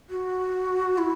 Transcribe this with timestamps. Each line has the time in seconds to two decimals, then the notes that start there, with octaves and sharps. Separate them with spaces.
0.10 F#4
0.98 E4